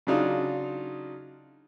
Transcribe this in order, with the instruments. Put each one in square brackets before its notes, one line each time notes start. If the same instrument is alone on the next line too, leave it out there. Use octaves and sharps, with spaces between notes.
[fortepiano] C#3 F#3 D4 D#4 F4